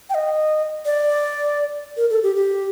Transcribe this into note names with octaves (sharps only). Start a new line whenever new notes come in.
G5
D#5
D5
A#4
A4
G4
G4